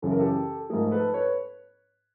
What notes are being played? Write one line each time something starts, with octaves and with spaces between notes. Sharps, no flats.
F#2 C#3 E3 A4
A#4
G4 A4
G#2 F3 A3 G#4 A#4
A4 B4
B4 C#5